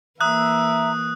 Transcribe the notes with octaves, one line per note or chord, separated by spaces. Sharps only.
E3 A#3 E5 A#5 D#6 F#6